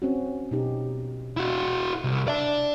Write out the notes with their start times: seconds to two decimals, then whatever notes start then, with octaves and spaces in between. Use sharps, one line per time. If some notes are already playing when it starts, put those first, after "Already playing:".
0.02 C4 C#4 F#4
0.51 B2 D#4 G4
1.37 E4 F#4
2.04 C2
2.28 D5 E5 A5